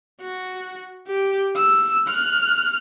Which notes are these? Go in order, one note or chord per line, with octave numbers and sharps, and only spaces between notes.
F#4
G4
E6
F6 F#6